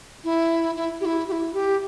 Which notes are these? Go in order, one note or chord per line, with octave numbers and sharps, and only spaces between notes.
E4
E4
G4
E4
G4
E4
G4